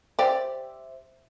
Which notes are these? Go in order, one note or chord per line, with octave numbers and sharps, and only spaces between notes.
G4 C5 D5 E5